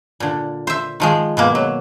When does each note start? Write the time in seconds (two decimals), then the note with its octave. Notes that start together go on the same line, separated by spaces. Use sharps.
0.20 A#2 D3
0.67 C5 E5
1.00 D#3 F3 G#3
1.37 B2 G#3 A#3
1.55 F#3